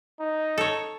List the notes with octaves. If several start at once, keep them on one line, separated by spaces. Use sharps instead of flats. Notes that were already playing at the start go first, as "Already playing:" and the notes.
D#4
A4 C#5